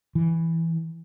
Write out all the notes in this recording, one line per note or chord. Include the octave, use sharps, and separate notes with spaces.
E3